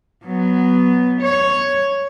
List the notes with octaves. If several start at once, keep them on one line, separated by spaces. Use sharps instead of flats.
F#3 B3
C#5